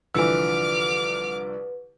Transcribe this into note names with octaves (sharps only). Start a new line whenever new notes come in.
C2 D3 E3 F3 B4 D6 E6 F6